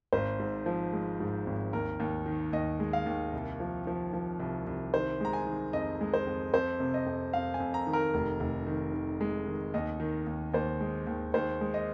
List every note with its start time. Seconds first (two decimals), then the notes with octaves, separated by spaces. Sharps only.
0.13 G#1 C5
0.40 G#2
0.66 F3
0.93 G#3
1.20 G#2
1.47 G#1
1.73 D#2 A#4
2.00 D#2
2.26 D#3
2.53 D#2 D#5
2.80 G#3
2.93 F5
3.06 D#2
3.33 C2
3.60 F3
3.87 F3
4.13 F3
4.40 C2
4.67 C2
4.93 D#3 C5
5.21 G#3 A#5
5.33 G#5
5.47 D#3
5.73 F2 D#5
6.01 G#3
6.14 C5
6.27 F2
6.54 F2 C5
6.80 C3
6.94 D#5
7.06 F2
7.33 F2 F5
7.54 G#5
7.60 F2
7.74 A#5
7.87 D#3
7.93 A#4
8.14 F1
8.40 F1
8.67 D#3
8.93 D#3
9.21 G#3
9.47 D#3
9.74 D#2 D#5
10.00 D#3
10.27 D#2
10.54 D#2 C5
10.81 G#3
11.07 D#2
11.34 D#2 C5
11.61 G#3
11.74 D#5